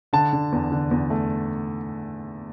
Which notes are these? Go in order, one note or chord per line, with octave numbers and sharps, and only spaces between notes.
D3 A5
D3
E2
D3
E2
A3